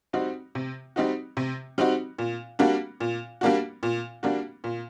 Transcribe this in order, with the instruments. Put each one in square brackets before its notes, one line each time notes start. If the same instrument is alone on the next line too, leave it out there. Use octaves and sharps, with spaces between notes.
[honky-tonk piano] G3 C4 D#4 F#4
C3
G3 C4 D#4 F#4
C3
G3 C4 D#4 F#4
A#2
G3 A#3 D4 F#4
A#2
G3 A#3 D4 F#4
A#2
G3 A#3 D4 F#4
A#2